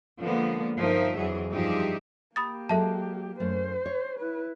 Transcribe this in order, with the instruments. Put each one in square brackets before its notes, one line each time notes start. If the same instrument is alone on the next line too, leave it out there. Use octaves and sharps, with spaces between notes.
[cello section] D3 F3 G#3 A#3 B3
G2 F3 D#4 A#4 E5
F2 E3 F#3 G#4
G2 F3 D#4 G4 G#4 E5
[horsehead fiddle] A#3 G4 [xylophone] B5 D#6 A6
[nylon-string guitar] F#3 G#3 [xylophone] A4 E5 A5
[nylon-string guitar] F#2 A3 [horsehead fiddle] C5
[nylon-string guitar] C#5
[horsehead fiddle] E4 B4